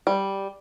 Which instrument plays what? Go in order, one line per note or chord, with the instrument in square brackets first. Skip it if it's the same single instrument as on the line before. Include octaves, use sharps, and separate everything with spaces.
[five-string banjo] G3